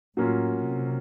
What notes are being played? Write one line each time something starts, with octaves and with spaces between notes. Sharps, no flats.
A2 F#3 A#3 C#4 F4
C3